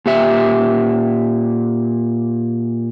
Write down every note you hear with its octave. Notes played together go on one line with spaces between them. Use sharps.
A#2 G4 E5